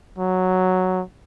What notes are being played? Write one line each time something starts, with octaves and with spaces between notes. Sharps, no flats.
F#3